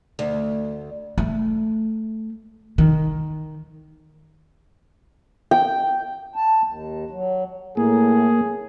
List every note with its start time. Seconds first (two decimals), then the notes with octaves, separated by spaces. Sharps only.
0.19 D2
1.18 A3
2.78 D#3
5.51 G5
6.36 A5
6.62 D#2
7.10 F#3
7.77 A2 A#3 G#4